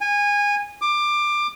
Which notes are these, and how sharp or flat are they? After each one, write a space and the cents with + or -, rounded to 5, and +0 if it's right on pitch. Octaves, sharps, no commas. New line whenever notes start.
G#5 -20
D6 +20